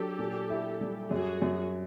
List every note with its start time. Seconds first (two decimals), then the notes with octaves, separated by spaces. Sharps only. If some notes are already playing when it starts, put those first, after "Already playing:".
Already playing: F#3 D4 G4 A4
0.19 A#2
0.50 E4
0.81 G3
1.11 F#2 F#4 G#4
1.42 F#2